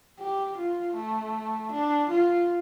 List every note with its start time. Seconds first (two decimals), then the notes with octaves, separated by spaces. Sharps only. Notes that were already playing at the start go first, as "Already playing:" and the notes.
0.19 G4
0.57 F4
0.95 A3
1.71 D4
2.09 F4